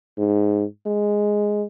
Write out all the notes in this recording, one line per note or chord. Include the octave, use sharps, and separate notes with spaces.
G#2
G#3